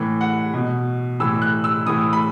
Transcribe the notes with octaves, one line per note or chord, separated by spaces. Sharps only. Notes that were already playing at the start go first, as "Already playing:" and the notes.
Already playing: A2 E3
F#5
B2
A2 E3 E6
F#6
E6
A2 E3 D#6
B5